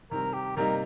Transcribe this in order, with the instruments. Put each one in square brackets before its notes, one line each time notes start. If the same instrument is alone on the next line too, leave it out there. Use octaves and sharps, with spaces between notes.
[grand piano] C3 D#3 G3 C4 [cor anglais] A#4
[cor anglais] G4
[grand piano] C3 G3 A#3 D#4 [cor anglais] A#4